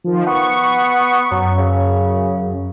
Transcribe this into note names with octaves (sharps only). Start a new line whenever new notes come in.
D#3 F3
B3 C#6
F#2 F#3
C#3